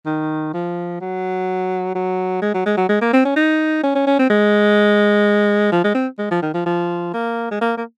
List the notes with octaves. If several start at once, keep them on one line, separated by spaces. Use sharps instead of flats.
D#3
F3
F#3
F#3
G#3
F#3
G#3
F#3
G#3
A#3
C4
C#4
D#4
C#4
C#4
C#4
C4
G#3
F3
G#3
C4
G#3
F3
D#3
F3
F3
A#3
G#3
A#3
A#3